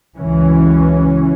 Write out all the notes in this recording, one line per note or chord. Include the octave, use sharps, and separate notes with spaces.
C#2 F#2 E3 C#4